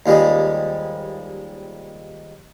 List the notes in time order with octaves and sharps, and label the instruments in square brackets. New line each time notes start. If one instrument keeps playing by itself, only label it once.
[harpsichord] D#2 F3 G3 G#3